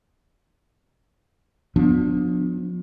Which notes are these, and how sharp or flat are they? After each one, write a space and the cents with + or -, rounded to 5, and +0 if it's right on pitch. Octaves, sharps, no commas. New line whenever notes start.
F3 +35 B3 +0 D4 +0